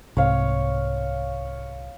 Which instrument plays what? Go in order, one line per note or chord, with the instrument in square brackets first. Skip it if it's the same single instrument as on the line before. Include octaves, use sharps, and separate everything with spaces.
[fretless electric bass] C2 G#2 C3 [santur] C#5 F5